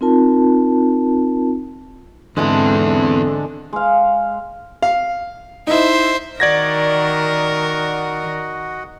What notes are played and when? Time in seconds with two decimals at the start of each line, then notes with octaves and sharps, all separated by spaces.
0.01 C4 D#4 F4 A#4 A5
2.37 E2 G#2 D3 G#3 B3 C4 E4 A4
3.73 G#3 F5
4.82 F5
5.67 D#4 E4 C5 E5
6.40 D#3 F#4 A#4 D5 D#5 F#5 G#6 A#6